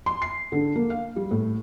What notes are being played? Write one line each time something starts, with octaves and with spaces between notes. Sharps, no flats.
C6
C7
D3
A#3
F5
G3
A2